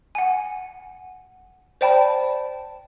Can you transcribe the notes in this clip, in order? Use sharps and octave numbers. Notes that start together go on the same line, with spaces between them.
F#5 G#5
C5 D5 G5 A5 B5